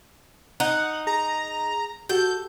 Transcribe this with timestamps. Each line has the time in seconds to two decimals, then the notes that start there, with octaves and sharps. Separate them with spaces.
0.60 D#4 F#5
1.07 G#4 A#5
2.09 F#4 G4 A4 G6